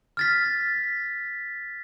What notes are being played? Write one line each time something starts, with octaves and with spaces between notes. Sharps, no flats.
F6 A6 B6